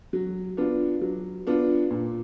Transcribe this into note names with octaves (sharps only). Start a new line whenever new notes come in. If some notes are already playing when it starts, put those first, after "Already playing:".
F#3
B3 D4 F4
F#3
B3 D4 F4
A#2